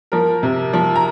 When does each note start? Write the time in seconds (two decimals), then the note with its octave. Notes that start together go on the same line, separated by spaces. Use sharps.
0.12 F3 A#4
0.43 C3
0.73 F3
0.96 A#5